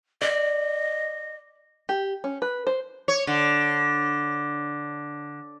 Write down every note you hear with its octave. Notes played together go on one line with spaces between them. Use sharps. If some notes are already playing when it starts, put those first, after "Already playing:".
D5 D#5
G4
C#4
B4
C5
C#5
D3